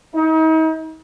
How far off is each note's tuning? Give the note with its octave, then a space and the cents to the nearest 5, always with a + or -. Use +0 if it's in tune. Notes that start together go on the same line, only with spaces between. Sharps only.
D#4 +40